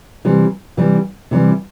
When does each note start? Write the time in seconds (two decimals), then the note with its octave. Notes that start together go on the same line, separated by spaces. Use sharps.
0.25 C3 E3 G3
0.77 C3 E3 G3
1.31 C3 E3 G3